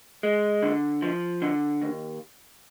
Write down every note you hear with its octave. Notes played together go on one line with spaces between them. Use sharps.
G#3
D3
F3
D3
D#2